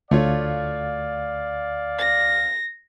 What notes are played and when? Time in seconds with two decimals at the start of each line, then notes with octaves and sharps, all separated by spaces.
0.11 D2 A3 F4 C#5 D5 F5
1.98 A#6